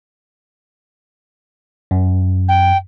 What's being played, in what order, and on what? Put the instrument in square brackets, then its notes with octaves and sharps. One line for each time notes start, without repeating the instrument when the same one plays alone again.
[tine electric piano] F#2
[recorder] G5